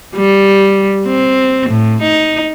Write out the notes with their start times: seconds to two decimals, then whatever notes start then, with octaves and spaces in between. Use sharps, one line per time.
0.15 G3
1.07 C4
1.69 A2
2.02 D#4